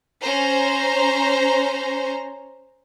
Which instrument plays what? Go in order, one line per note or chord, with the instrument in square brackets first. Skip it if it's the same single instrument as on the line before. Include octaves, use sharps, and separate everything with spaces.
[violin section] C#4 C5 A#5